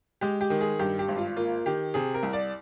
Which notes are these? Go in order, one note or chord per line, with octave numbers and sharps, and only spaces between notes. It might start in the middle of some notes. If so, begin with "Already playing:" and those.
G#3 G4
G4
D#3
G#4
G2 G4
G4
G#1
F4
A#3 F4
D#3 G4
C3 G#4
A#4
C2
D5